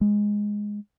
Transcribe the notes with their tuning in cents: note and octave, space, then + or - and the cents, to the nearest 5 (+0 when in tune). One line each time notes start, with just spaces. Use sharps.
G#3 -5